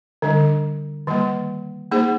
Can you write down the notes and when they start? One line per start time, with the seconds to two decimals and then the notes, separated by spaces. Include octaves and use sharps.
0.22 D3 G3 D4
1.07 D#3 G3 A#3
1.91 A#3 D#4 G#4 C5